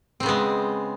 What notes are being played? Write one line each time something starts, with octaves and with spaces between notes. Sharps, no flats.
C#3 G#3 B3 C4